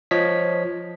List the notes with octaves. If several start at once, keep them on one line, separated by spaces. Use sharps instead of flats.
F3 C#5 D#5 B6